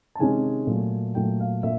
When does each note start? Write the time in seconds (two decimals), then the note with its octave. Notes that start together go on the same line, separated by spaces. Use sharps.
0.15 A5
0.19 C3 D#3 G#3 C#4 G#5
0.67 A#2 F#3 A3
1.15 A#2 F#3 A3 G5
1.40 F5
1.63 A#2 E5